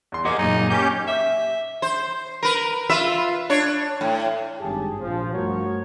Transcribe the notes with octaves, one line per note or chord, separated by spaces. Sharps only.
E2 C6
A#3 G4 G#4 C5 D#5 F#5
F#2 A#2 D#4
A#3 C#4 G4 G6
E5
C5
A#4 B4
F4 B4 E5
D4 C#5
A2
G#1 G2 G4 G#4 A5
A#1 F3
G2 A3 F#4 A#4 C#5